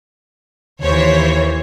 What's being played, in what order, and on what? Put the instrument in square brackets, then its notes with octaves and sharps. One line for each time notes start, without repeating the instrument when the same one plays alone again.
[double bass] D#2 [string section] E3 C5 C#5